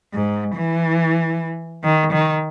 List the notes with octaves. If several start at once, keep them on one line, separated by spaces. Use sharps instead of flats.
G#2
E3
D#3
D#3